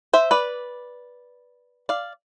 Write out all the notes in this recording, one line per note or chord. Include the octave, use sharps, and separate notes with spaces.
C5 E5
B4 D5
D5 F5